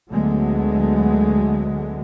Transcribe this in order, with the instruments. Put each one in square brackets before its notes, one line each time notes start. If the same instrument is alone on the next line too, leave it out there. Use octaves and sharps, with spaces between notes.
[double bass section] D2 D3 F#3 G#3 A3 B3